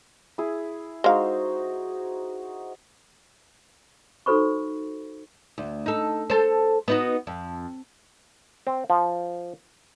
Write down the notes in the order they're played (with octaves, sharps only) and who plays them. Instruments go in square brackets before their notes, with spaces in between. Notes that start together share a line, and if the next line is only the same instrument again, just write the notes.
[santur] E4 G#4
[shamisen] G#3 F5 [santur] D#4 F#4 C5
[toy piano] D#4 F#4 A4 C5 B5 C#6
[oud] D2
D#4 A4
A4 C5
B3 D#4 F#4
F2
[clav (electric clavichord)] C4
F3